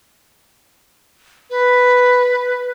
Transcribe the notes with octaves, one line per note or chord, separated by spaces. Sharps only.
B4